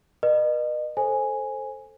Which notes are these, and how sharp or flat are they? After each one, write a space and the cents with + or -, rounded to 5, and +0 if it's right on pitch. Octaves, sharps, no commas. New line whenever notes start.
B4 -40 D#5 -35
A4 +0 C5 +15 G#5 +0